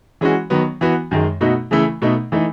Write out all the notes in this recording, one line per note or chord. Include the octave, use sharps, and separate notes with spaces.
E3 G#3 C#4 F#4
D#3 F#3 B3
E3 B3 F#4
F#2 D#3 G#3
B2 A3 D#4 F#4
C#3 E3 A3 E4
B2 A3 D#4
E3 A3 D#4